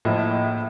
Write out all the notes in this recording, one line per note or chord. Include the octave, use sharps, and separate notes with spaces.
A2 F3 A#3 D#5
E5
D#5
E5